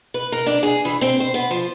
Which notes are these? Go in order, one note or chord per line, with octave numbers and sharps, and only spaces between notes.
B4
A#4
D4
G#4
E3
C4
C5
B3
F3